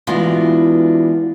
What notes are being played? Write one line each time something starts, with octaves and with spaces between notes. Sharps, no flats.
E3 G#3 B3 D4 F4 F#4